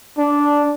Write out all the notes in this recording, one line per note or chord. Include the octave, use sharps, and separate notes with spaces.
D4